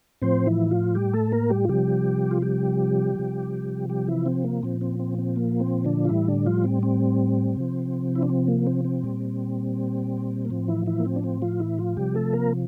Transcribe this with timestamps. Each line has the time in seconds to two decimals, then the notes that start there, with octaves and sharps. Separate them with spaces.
0.22 A2 F3 C4 C5
0.46 E3 E4
0.71 F3 F4
0.95 G3 G4
1.13 A3 A4
1.32 A#3 A#4
1.50 G3 G4
1.65 F4
1.69 C3 F3 G3 G4
2.31 F4
2.42 G3 G4
3.16 C3 F3
3.89 G3 G4
4.07 E3 E4
4.26 C4
4.44 A#3
4.63 A#2 F3 C4
4.81 C4
5.00 C4
5.18 C4
5.36 A#3
5.60 C4
5.85 D3 D4
6.05 F4
6.09 A2 E3 G3 E4
6.28 D3 D4
6.46 F3 F4
6.64 C4
6.83 C4
7.57 C3 F3
8.15 E4
8.23 D4
8.29 C4
8.48 A#3
8.67 C4
8.85 C4
9.03 A#2 G3
10.45 A#3
10.50 A2 F3 C4
10.68 E3 E4
10.86 E3 E4
11.00 A#3
11.05 C4
11.16 D4
11.24 C4
11.42 F3 F4
11.60 E3 E4
11.78 F3 F4
11.97 C3 F3 G3 G4
12.15 A3 A4
12.33 A#3 A#4